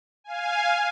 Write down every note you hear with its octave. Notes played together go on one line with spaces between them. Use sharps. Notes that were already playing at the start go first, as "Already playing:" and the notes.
F5 G#5